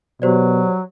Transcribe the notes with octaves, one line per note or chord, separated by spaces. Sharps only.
B2 F#3 G4 C5 D5